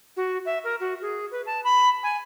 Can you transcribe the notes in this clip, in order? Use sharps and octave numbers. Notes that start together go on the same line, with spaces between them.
F#4
E5
A#4
F#4
G#4
B4
A5
B5
G#5